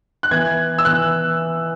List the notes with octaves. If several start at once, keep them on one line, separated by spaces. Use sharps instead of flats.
F#6
E3 B3 G#6
E6
E3 B3 F#6